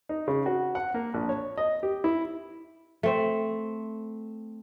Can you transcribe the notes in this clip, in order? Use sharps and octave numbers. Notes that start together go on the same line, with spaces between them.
D#4
C#3
F#4
F#5
A#3
A#1
C#5
D#5
G4
E4
A3 C4